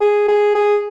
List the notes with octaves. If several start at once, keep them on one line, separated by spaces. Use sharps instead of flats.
G#4
G#4
G#4